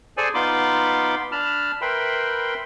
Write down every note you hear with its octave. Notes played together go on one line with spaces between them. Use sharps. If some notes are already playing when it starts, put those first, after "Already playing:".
G#4 A4 C5 D5 G#5
B3 D#4 F4 B5 C6 D6
D4 A5 B5 F6
A#4 B4 E5 G5 B5 C6